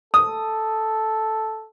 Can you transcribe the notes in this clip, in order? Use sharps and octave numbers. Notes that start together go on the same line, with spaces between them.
A4 D#6